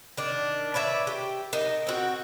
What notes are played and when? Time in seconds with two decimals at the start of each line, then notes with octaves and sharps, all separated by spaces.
0.17 D#3 D4
0.74 B4 C#5 D5 E5
1.07 G4
1.53 D#4 A#4
1.87 C4 F#4